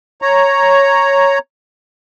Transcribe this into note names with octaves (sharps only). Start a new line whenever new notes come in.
C#5 A#5